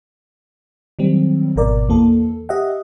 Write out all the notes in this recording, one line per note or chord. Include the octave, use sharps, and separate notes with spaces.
D#3 F#3 G3 C4
G#1 B2 A#4 D5
E2 E3 A#3 A4
G4 D#5 E5 F#5